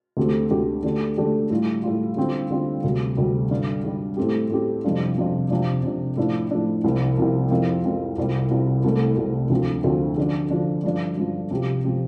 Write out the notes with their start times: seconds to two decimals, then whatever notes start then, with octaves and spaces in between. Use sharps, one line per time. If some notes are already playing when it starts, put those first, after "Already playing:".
0.17 D2 D3 A3 C4 G4
0.51 D2 D3 A3 C4 G4
0.83 D3 A3 D4 G4
1.17 D3 A3 D4 G4
1.50 A2 G3 F4
1.84 A2 G3 F4
2.17 D3 G3 C4 F4
2.50 D3 G3 C4 F4
2.84 D2 C3 G3
3.17 D2 C3 G3
3.51 G2 D3 G3
3.84 G2 D3 G3
4.17 A2 A3 C4 G4
4.50 A2 A3 C4 G4
4.84 F2 C3 G3 D4 F4
5.18 F2 C3 G3 D4 F4
5.51 C3 F3 D4
5.83 C3 F3 D4
6.17 A2 F3 D4
6.51 A2 F3 D4
6.84 C2 C3 F3
7.17 C2 C3 F3
7.51 F2 F3 C4 F4
7.84 F2 F3 C4 F4
8.18 C2 C3 G3 F4
8.51 C2 C3 G3 F4
8.84 C2 C3 A3
9.17 C2 C3 A3
9.50 D2 D3 F3 C4
9.84 D2 D3 F3 C4
10.18 D3 F3 D4
10.51 D3 F3 D4
10.83 G2 F3 D4
11.17 G2 F3 D4
11.51 C3 F3 C4 G4
11.85 C3 F3 C4 G4